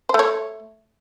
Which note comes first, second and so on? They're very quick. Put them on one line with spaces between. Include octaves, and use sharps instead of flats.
C5 A3 C#5